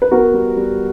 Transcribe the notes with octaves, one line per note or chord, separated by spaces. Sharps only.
B4
B3 F#4 A#4
G3
G3